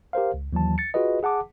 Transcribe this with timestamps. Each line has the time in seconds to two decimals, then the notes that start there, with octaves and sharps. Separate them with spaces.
0.13 G4 A#4 C5 F5
0.34 C#2
0.53 D#2 E3 F#3 A5
0.78 A6 C#7
0.94 F4 F#4 G#4 B4 D#5
1.23 G#4 F#5 A5 D6